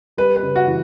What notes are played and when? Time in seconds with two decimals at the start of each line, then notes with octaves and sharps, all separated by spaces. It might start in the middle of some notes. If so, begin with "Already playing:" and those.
0.17 G3 B4
0.36 B4
0.43 C#3
0.56 F#4
0.67 E3